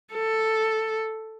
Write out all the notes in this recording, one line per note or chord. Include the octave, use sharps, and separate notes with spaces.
A4